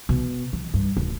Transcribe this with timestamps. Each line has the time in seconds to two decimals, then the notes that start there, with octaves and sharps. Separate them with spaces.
0.09 B2
0.53 F3
0.74 G2
0.97 D1